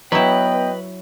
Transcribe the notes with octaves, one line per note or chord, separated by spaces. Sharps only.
F#3 B3 E4 B4 D#5 G5